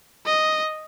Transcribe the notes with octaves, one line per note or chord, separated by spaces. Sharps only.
D#5